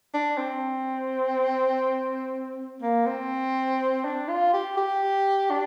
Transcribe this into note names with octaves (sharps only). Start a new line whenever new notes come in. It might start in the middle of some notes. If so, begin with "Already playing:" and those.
D4
C4
A#3
C4
D4
F4
G4
G4
D4